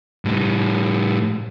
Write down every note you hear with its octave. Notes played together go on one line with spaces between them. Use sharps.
A2 G3